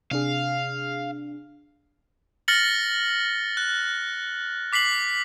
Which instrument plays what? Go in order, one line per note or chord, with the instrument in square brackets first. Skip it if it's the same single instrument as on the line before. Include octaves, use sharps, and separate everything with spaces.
[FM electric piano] C3 D4 G#4 [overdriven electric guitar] F5
[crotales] F6 A6 A#6 C#7 F#7 G7
F#6
D6 B6 C7 F#7